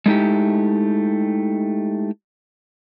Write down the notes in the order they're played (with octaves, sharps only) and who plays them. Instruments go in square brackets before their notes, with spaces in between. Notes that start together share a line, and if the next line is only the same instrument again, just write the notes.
[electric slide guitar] G#3 A3 D#4 E4 G4